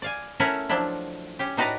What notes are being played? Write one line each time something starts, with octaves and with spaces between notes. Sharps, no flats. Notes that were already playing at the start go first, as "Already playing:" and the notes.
D5 F5 G#5
A3 C#4 E4 A#4 E5 F#5
F3 F#3 D4 E4
C#4 G4
A2 D#4 F#4 B4 D5 A#5